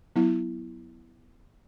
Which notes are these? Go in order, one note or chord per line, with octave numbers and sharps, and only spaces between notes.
F#3 B3 E4